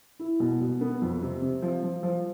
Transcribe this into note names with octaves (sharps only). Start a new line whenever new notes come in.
E4
B2
B2
B3
F2
C3
C3
F3
F3
F3